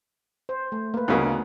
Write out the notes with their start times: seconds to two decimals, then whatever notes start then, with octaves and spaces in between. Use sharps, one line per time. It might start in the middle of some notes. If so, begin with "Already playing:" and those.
0.49 C5
0.72 A3
0.94 A#3 B4
1.08 D2 C#3 A#3 B3 D#4